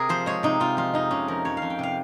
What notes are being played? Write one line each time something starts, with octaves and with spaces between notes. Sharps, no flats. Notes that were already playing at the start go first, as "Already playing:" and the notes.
Already playing: C3 G#4 A#4
F3 C5
G#3 C#5
C3 D#4
C3 F4
F3 F4
F2 D#4
C3 C#4
F3 A#4
F2 C#5
F5
F2
G5
C3 F5